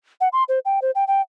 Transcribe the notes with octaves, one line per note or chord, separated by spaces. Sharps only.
F#5
C6
C5
G5
C5
G5
G5